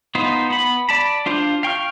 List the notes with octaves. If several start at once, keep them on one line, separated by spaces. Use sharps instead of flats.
B3 D#4 F4 C5
B3 B5
D5 A5 B5
D4 F4 C5 F5
F5 G5 C#6 F6